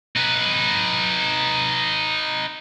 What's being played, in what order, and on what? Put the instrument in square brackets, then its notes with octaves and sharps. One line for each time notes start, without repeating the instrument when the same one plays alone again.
[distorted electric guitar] D#4 B4